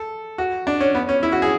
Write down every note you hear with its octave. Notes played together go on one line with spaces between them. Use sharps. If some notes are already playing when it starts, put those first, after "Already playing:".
Already playing: A4
F#4
D4
C#4
B3
C#4
E4
F#4
G#4